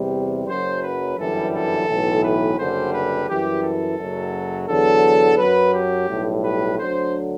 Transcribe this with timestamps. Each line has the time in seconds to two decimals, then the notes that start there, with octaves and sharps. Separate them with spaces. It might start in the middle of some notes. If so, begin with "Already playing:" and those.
Already playing: E2 C3 G3
0.47 F#1 F#2 F#3 C5
0.82 B4
1.17 G1 F#2 E3 G3 A4
1.53 A4
1.88 B1 A2 E3
2.23 B4
2.59 F#1 F#2 D3 G3 C5
2.92 B4
3.28 F#2 E3 G3 G4
3.63 A4
3.98 F#1 F#2 F#3
4.68 E2 D3 F#3 A4
5.38 F#2 F#3 B4
5.73 G4
6.08 B1 A2 G3
6.43 B4
6.79 D2 D3 F#3 C5